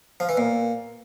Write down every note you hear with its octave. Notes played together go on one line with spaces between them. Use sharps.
F3
E3
A#2